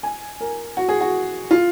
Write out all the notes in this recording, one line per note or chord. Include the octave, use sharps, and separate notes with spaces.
G#5
A#4
F#4
G#4
F#4
F4